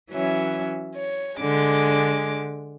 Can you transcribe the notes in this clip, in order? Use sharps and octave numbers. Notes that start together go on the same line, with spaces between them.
E3 F#3 C#4 E5
C#5
D3 G#3 D6